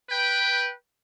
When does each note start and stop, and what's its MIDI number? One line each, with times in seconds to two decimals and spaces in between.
0.10 0.70 71
0.10 0.70 79